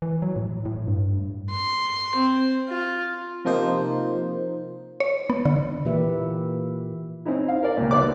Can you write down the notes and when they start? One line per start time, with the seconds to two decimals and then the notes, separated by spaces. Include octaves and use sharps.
0.02 E3
0.22 F#3
0.36 A2
0.65 A2
0.87 G2
1.50 C6
2.16 C4
2.69 F4
3.45 C3 F3 A#3 D#4 C5
5.00 C#5
5.30 B3
5.45 D3
5.85 A#2 E3 A#3 G4 B4 E5
7.25 C4 C#4 D#4 E4
7.48 F5
7.63 A#4 D5
7.77 C#2 A#2
7.91 A#1 B3 D5 E5 D6